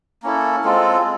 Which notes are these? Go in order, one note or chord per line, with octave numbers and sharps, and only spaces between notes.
A#3 C#4 E4 A4
G#3 C4 F4 A4